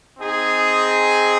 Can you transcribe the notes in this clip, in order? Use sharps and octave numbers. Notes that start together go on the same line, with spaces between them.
C4 D#4 G#4